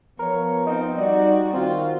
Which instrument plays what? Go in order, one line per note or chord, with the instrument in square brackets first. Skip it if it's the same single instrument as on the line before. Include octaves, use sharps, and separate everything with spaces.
[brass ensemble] F3 B3 [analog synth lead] A#4 [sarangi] C#5
[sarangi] C4 [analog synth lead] D#4
[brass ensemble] G3 D5 [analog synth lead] D#4 [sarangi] F#4
[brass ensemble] D#3 F#4 [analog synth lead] C4 [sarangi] F4